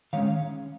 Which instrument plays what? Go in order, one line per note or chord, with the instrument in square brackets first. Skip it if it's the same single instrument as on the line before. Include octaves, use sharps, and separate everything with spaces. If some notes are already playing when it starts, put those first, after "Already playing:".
[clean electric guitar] D#3 G#3 C#4 C#5 F5